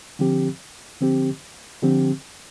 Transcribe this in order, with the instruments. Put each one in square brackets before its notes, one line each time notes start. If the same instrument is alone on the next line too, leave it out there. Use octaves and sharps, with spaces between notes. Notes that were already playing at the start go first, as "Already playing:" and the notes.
[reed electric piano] D3 F3 C4 G4
D3 F3 C4 G4
D3 F3 C4 G4